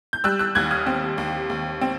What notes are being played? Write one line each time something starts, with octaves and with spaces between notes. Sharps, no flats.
G6
G3 E6 F#6
E6 F#6
D#2 F#6 G#6
D#6 F6
C4
D#2
D#2
C4